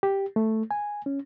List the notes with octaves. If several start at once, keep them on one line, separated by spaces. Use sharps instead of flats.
G4
A3
G#5
C#4